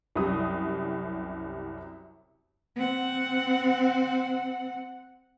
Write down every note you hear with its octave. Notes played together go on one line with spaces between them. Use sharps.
C2 F#2 G4 D#6
C4 F#5